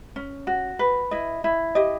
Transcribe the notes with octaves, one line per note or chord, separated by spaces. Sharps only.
C#4
F#4
B4
E4 D#5
E4
G4 D#5